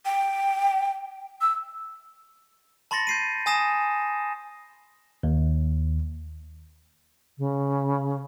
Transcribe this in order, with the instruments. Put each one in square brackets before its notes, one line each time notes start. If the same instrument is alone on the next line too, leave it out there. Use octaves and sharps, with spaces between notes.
[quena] G5
E6
[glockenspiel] A5 B5 C6 A6 A#6 C#7
G6 C7 D#7
G#5 A5 D#6 A#6 C7 E7
[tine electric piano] D#2
[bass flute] C#3